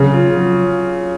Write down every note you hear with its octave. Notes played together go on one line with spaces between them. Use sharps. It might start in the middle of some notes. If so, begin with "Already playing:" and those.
Already playing: C#3 F#3
F4
F#3